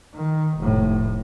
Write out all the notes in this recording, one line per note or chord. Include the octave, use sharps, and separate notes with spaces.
D#3
F1 A2